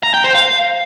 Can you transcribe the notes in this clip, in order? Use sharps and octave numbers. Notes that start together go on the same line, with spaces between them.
A#5
G5
C5
F5